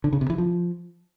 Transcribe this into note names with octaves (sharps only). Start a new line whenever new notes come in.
D3
C#3
C3
E3
F3